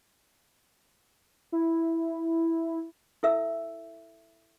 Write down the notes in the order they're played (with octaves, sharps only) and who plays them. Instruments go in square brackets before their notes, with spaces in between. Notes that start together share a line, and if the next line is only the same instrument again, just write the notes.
[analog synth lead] E4
[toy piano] E4 A4 E5 E6